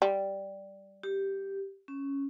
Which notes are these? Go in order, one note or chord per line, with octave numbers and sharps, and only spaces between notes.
G3
G4
C#4